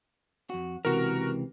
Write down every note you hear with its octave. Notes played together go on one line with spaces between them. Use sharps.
F2 F#4
C#2 C3 E3 F#4 A#4